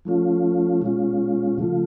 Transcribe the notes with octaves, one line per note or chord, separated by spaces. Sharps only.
F3 A3 C#4 F4
B2 G#3 C#4 F4
C#3 F3 A3 F4